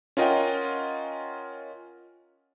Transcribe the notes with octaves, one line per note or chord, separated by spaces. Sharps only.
C#4 F4 A#4 D#5 F#5 G5